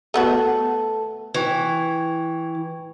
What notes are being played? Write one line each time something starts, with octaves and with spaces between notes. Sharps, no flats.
A3 B3 F#4 A4 A5
E3 G5 C#6 G#6